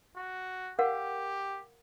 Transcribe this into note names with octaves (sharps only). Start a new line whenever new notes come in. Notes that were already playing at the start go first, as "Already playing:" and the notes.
F#4
G4 A#4 F5 F#5